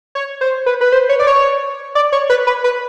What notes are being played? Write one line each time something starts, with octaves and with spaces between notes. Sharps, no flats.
C#5
C5
B4
B4
C5
C#5
D5
C#5
D5
C#5
B4
B4
B4